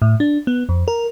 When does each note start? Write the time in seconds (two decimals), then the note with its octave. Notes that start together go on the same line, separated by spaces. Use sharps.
0.02 A2
0.20 D4
0.47 B3
0.69 F2
0.88 A#4